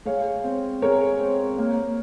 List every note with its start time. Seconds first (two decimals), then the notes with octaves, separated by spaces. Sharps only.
0.05 G#3 C#5 F5
0.44 C4
0.82 G#3 A#4 C#5
1.20 C4
1.58 A#3